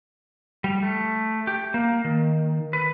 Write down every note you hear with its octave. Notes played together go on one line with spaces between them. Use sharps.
G3
A3
G4
A#3
D#3
B4